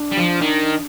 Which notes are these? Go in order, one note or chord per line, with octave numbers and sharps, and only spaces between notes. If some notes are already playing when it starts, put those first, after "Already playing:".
Already playing: D4
G3
F3
D#3